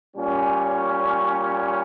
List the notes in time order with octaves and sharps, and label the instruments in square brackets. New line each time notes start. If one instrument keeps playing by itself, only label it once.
[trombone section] A#2 G3 C#4